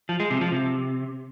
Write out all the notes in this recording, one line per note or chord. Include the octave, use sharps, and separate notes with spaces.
F3
G#3
C3
F3
C3